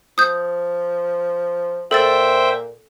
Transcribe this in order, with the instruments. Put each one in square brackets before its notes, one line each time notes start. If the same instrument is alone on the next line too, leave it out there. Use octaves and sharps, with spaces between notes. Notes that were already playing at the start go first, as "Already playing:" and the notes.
[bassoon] F3 [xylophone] D#6 G6
[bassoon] A#2 [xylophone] A4 E6 A6 [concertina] C5 E5 G5